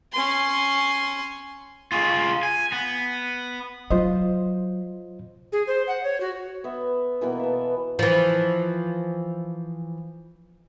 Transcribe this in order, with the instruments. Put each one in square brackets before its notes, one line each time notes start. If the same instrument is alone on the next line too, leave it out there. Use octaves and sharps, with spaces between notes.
[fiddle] C#4 C6
[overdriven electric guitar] F4 G#4
G#5
B3
[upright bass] F#3 [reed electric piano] F4 C5 D#5
[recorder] G#4
C5
F#5
C#5
F#4
[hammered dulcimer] B3 E5
B2 E3 A#3 B3
E5 A5
[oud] E3 F3